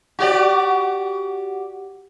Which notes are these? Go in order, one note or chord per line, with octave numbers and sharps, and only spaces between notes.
F#4 G4 D5